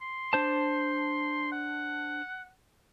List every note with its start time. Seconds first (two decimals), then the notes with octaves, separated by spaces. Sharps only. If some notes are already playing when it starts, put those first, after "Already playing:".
0.02 C6
0.33 D4 C5 A5
1.52 F#5